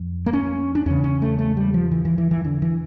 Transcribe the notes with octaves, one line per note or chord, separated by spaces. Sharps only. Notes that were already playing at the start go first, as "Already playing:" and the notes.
Already playing: F2
A#3
C#4
D4
E2 C#3 C#4
C#4
A3
A3
G3
F3
E3
E3
E3
E3
D3
E3